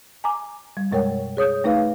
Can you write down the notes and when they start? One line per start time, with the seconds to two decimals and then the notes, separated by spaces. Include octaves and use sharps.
0.24 G#5 A#5 D6
0.77 G3
0.91 F#2 B2 G#3 A#4 C#5 G5
1.37 G#4 C#5 D#6 G6
1.64 A3 D#4 B4 F5